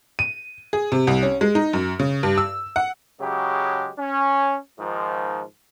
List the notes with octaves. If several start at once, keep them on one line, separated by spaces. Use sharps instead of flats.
D#7
G#4
C3
C2
C#4
G#3
D#4
F#2
C#3
G2
E6
F#5
C#3 F#3 G#3 G4
C#4
G#2 D#3 F3